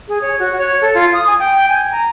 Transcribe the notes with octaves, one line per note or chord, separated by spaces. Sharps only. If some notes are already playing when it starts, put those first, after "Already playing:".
G#4
C#5
F#4
C#5
A4
F4
D#6
G#5
G5
G#5
A#5